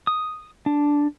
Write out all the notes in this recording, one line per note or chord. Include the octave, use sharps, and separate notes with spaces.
D#6
D4